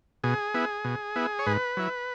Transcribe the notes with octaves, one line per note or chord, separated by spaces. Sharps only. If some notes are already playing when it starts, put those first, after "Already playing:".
B2 G#4
B3 E4
B2
B3 E4
C#5
G#2 B4
F#3 E4